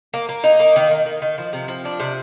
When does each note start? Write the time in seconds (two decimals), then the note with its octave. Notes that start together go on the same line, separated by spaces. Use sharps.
0.14 A#3
0.29 A#3
0.44 D#4
0.60 A#3
0.76 D#3
0.91 D#3
1.06 D#3
1.22 D#3
1.38 F3
1.53 C3
1.68 F3
1.85 D4
2.00 C3